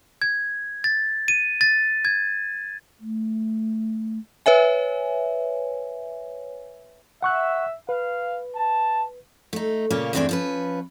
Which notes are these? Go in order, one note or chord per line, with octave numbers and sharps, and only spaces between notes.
G#6
A6
D#7
A6
G#6
A3
B4 C#5 E5 G#5
E5 F#5 C#6 F#6
B4 F5
A5
A3 D#4
A#2 C#3 A#3 C#4 C#5
E2 G2 A3 C4 D4 G#4
F3 C#4 B4